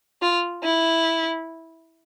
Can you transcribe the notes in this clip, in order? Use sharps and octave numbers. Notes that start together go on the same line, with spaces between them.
F4
E4